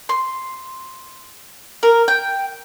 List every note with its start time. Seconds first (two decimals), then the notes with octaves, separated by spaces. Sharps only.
0.09 C6
1.83 A#4
2.08 G5